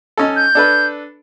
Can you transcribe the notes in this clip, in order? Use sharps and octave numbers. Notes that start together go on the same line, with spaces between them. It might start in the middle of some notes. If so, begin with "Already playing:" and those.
C#4 D#4 A4
G6
D4 A4 B4